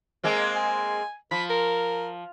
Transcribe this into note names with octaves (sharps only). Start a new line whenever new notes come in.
G#3 A#3 C4
G#5
F3 B5
A#4